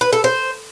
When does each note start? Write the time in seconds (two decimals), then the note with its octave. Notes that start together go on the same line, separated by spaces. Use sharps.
0.01 B4
0.13 A4
0.24 C5